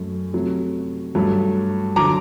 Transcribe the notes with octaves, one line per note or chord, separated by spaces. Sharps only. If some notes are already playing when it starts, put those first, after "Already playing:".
Already playing: F#2 F#3 A3
C3 F#3 A3
G2 F#3 A3
D3 F#3 A#5 D6